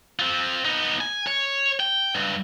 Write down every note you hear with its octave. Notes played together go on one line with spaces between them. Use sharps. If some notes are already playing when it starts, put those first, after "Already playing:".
C4 F4
B3 D#4
G#5
C#5
G5
C#2 G2